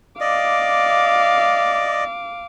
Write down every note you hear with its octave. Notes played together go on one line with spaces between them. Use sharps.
D5 D#5 F5 D6